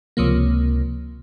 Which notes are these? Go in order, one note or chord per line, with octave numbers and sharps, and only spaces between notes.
C#2 C3 F3 A#3